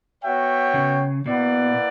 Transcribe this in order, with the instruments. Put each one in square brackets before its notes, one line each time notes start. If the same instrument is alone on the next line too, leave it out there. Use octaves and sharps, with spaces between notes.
[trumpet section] B3 F#4 C#5 E5 G5
[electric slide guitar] C#3
[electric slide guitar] B2 [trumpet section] A#3 E4 B4 D5 F#5